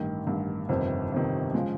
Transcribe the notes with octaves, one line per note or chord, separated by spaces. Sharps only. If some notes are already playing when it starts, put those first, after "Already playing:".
Already playing: A1 G2 D#3
A1 G2 D#3
G1 F2 C3 D#3
G1 F2 C3 D#3
C#3 F3 G#3